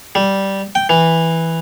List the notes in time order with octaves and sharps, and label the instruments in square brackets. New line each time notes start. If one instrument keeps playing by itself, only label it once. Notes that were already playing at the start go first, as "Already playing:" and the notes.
[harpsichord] G3
G5
E3